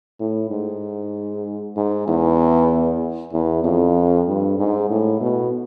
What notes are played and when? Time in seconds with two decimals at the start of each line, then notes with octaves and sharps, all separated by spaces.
0.20 A2
0.51 G#2
1.77 G#2
2.08 E2
3.33 E2
3.64 F2
4.28 G2
4.58 G#2
4.90 A2
5.21 B2